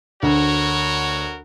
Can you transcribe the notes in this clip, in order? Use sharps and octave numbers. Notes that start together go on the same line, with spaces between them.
D2 F#4 A#4 C#5